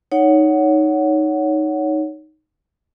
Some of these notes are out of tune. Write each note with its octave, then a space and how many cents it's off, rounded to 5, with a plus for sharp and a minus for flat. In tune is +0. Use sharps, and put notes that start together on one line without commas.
D#4 +0 C#5 +15 F#5 +5